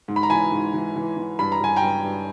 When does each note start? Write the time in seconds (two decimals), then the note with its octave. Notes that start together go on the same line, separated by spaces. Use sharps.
0.08 G#2
0.16 B5
0.23 A#5
0.30 E3 G#5 B5
0.52 G#2
0.74 E3
0.96 E3
1.17 E3
1.39 G2 B5
1.52 A#5
1.60 G2 G#5
1.76 G5 A#5
1.82 G2
2.04 G2